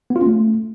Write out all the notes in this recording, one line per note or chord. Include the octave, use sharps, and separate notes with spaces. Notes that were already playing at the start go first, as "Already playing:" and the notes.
B3
F4
C#4
A3